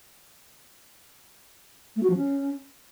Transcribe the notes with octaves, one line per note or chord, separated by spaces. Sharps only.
A3
F#4
F3
C#4